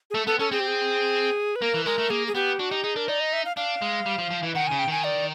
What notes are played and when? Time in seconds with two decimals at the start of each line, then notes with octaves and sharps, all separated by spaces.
0.10 G#4
0.14 A3 A4
0.27 B3 A4
0.39 C#4 A4
0.51 C4 G#4
0.60 G4
0.68 G#4
1.56 B4
1.62 A#3 A#4
1.74 E3
1.85 G#3 A#4
1.98 A3
2.10 A#3 G#4
2.27 G#4
2.35 B3 G4
2.59 D4 F#4
2.71 D#4 G4
2.84 D#4 G#4
2.96 D4 A#4
3.08 D#4 D5
3.20 D#5
3.33 E5
3.45 F5
3.56 D4 F5
3.82 G#3
4.06 G3
4.18 F3
4.31 F3
4.43 E3
4.55 D#3 F#5
4.67 C#3 G#5
4.79 G5
4.88 D#3 G#5
5.04 D5